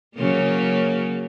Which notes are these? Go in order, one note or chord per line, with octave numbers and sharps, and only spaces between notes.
C#3 F#3 A#3